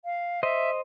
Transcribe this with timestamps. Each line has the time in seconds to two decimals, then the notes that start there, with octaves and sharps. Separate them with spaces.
0.05 F5
0.43 C5 D#5 E5